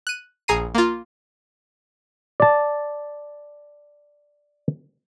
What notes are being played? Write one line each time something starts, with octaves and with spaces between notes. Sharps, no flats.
F#6 D#7
A#1 G#4 A#5 C7 D#7
A#3 F4
D5 A5